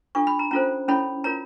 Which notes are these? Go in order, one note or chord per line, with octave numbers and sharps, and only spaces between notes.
D4 F4 A4 C#6
B5
A#5
C#4 F4 A4 C5 A#5
C#4 E4 A4 C#5 B5
F4 A#4 C#5 A#5